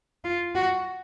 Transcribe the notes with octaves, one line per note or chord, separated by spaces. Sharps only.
F4
F#4